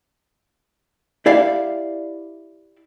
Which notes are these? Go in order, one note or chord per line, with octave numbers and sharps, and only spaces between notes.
E4 G4 D5 E5 F5